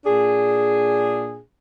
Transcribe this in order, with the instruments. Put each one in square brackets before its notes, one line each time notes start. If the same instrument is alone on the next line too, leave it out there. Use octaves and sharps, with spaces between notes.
[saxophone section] A#2 D4 G#4